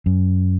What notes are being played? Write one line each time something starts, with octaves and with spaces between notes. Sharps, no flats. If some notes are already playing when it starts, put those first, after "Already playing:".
F#2